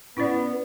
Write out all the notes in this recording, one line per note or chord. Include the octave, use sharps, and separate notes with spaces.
B3 C#4 E4 B4 D5